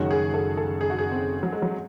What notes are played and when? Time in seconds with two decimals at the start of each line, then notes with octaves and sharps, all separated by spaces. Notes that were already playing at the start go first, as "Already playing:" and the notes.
Already playing: F#1 F#2 D#3 G#3 C#4 F#4
0.11 G#4
0.34 A4
0.57 A4
0.81 G#4
0.90 F#4
0.98 G#4
1.12 C4
1.43 F#3
1.52 G#3
1.62 F#3